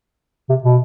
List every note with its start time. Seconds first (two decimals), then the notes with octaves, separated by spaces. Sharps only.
0.49 C3
0.64 B2